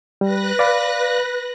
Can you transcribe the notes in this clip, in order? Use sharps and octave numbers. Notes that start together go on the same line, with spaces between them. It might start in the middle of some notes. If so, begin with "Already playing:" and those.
G3 B4 F#6 A#6
D5 F5 B5